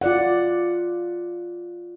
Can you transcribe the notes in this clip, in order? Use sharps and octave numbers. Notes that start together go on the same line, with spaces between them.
F4 D5 F#5